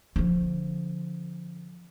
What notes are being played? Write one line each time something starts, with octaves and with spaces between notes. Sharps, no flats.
D3 F3